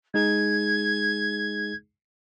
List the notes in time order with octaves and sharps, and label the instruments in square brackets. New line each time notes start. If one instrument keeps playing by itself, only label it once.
[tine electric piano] G#3 D#4 G#4 [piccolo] G#6